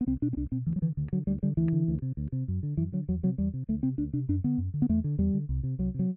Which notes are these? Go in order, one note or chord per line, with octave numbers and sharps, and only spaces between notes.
B3
C2 C4
B2 D4
C4
C2 D4
B2 C4
D2 E3
F#3
D3 E3
D2 D3
D3 F#3
D2 G3
D3 G3
D2 E3
D3
D2
C3
D2
C3
F#2
D3
F#2 E3
D3 F#3
E2 F#3
C3 F#3
E2 G3
C3
D2 A3
C3 C4
D2 D4
C3 D4
F#2 D4
D3 B3
F#2
D3
B3
E2 A3
D3
E2 G3
D3
C2
C3
C2 F#3
C3 F#3